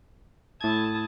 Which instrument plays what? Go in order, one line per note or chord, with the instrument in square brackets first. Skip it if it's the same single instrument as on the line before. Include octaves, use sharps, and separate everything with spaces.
[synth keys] A2 G#6 [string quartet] E4 A5 D#6